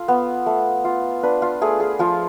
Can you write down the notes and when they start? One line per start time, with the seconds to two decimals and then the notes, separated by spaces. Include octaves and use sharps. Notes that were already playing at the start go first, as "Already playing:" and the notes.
Already playing: F4 A4
0.08 B3
0.46 A3
0.84 F4
1.23 D4 B4
1.42 F4
1.61 A3 G#4
1.80 G#4
1.99 F3 F4